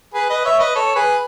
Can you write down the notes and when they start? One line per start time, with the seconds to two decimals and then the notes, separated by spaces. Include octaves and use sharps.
0.14 G#4 B4
0.30 B4 D#5
0.45 C#5 E5
0.59 B4 D#5
0.75 A4 C#5
0.95 G#4 B4